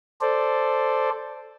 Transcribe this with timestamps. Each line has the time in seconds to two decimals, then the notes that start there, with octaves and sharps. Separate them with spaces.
0.21 A4 C5 D5